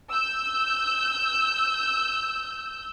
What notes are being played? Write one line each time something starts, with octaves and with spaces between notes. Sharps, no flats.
E6 G6